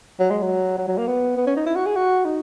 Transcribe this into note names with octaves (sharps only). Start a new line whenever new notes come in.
F#3
G#3
F#3
F#3
F#3
A#3
B3
B3
C#4
D#4
E4
F#4
G#4
F#4
D#4